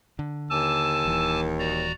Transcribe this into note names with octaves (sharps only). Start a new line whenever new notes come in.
D3
D#2 G#5 A5 D6 E6
D#1 E3
F#4 D5 A#5